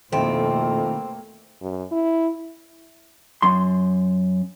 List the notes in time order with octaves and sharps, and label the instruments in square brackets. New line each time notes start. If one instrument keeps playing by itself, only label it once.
[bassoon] F2 [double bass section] B2 A3 A#3 [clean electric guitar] D#3 E4 F4 [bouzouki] C4
[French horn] F#2
E4
[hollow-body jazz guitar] F#2 C6